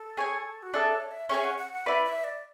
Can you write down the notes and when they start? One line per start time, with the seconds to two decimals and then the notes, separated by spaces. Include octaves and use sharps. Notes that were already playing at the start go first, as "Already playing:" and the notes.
Already playing: A4
0.17 G#4 C#5 G#5
0.63 F#4
0.74 D4 G#4 A4 E5 A5
0.92 C#5
1.11 E5
1.29 C#4 G#4 C#5 E5 G#5
1.44 F#5
1.58 F#5
1.73 F#5
1.86 E4 B4 D5 E5
2.05 E5
2.24 D5